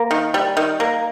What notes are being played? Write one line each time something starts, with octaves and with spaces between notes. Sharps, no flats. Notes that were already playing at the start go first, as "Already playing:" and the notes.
Already playing: A#3
D#3
G3
D#3
A#3